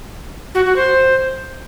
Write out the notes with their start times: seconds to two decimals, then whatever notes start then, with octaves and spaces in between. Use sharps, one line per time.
0.55 F#4
0.65 F#4
0.76 C5